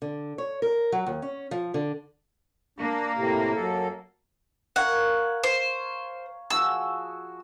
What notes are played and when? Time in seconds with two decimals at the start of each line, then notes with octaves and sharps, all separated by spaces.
0.02 D3
0.38 C#5
0.62 A#4
0.92 F#3
1.06 D#2
1.22 C#4
1.51 F3
1.74 D3
2.79 A#3 D4
3.15 A2 C3
3.55 F#2 A4
4.76 A#4 C#5 F5 F#5
5.43 C5
6.50 F3 F#4 G#4 E6